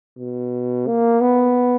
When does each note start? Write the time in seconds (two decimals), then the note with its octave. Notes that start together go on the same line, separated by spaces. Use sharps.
0.18 B2
0.87 A#3
1.21 B3